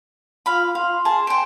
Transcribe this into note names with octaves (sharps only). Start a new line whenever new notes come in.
F4 F5 B5
F5 C6
G#4 A5 A#5
C5 G5 D7